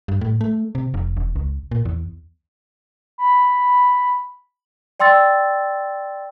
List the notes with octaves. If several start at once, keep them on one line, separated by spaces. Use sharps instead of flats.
G2
A2
A3
C3
F1
E1
C#2
A#2
E2
B5
D5 G5 C6 E6 A6